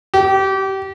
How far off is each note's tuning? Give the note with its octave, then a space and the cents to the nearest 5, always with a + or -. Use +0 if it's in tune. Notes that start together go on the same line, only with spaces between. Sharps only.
G4 -25